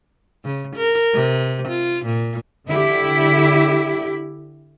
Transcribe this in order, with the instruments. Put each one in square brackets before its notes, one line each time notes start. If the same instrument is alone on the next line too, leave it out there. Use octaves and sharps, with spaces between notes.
[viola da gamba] C#3
A#4
C3
F4
A#2
[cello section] D3 E4 G4